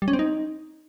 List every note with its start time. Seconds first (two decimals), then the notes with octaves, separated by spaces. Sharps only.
0.02 G3
0.08 C#4
0.13 C4
0.19 D#4